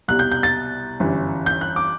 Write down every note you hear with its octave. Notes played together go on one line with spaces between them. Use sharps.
C2 B2 G3 F#6
G6
G6
A6
G1 F#2 E3 G3
G6
F#6
D6